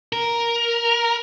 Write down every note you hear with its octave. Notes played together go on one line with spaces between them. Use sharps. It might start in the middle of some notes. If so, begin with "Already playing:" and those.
A#4